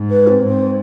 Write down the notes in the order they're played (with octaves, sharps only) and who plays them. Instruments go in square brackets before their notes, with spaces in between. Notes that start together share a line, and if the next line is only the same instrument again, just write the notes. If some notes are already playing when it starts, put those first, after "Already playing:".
Already playing: [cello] G#2
[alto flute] B4
C4
[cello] G#2 [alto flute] C4